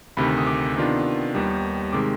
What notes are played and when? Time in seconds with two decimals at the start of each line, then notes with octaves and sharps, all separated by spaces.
0.17 D2 C3 D#3 B5
0.38 D#6
0.47 D6
0.76 C3 D#3 B3 D4 F4
1.34 D#2 D#3 G3 B3 D#4
1.93 C3 D#3 G#3 D6